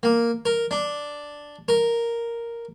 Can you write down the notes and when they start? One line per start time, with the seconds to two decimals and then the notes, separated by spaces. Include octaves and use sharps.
0.03 A#3
0.45 A#4
0.71 D4
1.68 A#4